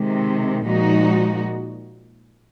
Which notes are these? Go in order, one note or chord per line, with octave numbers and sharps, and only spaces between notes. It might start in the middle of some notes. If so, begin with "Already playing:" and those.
Already playing: C3 D#3 G#3
A#2 F3 G#3 D#4 F#4